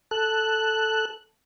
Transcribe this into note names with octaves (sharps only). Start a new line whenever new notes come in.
A4 F#6